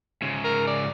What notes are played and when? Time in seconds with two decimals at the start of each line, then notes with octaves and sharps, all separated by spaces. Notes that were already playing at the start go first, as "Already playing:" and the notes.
0.22 G#2 C#3
0.45 A#4
0.68 D5